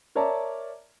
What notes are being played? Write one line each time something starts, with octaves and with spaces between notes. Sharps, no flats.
A#4 C#5 D5 E5 A5 A#5